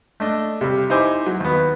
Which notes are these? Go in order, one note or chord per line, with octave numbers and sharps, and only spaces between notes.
A3 D4 D#5
C3 G3
D#4 E4 C5 G#5 C6 D6
F#3
D#2 B3